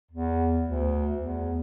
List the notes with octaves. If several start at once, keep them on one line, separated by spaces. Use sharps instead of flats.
E2
D2
E2